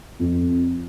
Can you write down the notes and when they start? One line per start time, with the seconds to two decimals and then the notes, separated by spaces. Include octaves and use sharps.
0.19 F2